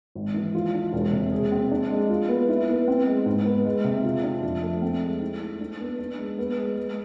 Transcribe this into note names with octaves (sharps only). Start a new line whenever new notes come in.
G#1
E3
F4
D4
E1
C3
G#4
C4
D4
G#3
F4
B3
E4
B3
C4
G#3
G#2
B3
G#3
C3
F4
D4
F2
A3
C4
G#3
E4
A3
D4
B3
D4
G#3
B3
G#3
G#3